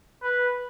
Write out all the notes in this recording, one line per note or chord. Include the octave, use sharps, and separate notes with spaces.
B4